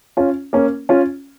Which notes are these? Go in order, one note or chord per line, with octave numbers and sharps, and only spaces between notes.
C#4 F4
A#3 C#4
C#4 F4